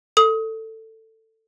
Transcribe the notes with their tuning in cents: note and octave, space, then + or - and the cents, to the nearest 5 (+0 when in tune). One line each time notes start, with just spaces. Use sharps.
A4 +15 D#6 +25